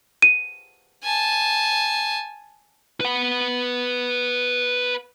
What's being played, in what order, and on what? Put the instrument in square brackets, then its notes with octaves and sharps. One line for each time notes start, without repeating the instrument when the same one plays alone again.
[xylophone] D#7
[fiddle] G#5 A5
[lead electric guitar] B4 F#5